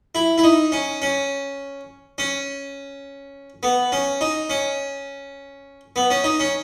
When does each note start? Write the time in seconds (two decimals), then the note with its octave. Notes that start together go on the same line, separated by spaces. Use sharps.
0.15 E4
0.38 E4
0.44 D#4
0.72 C#4
1.02 C#4
2.18 C#4
3.63 B3
3.92 C#4
4.21 D#4
4.50 C#4
5.96 B3
6.11 C#4
6.24 D#4
6.40 C#4